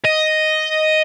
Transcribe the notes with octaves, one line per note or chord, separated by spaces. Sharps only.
D#5